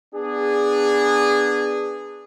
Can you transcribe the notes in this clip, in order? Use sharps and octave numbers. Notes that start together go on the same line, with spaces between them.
B3 D4 G#4